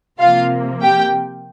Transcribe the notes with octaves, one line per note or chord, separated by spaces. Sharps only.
C3 F3 A#3 F4 F5
G4 G5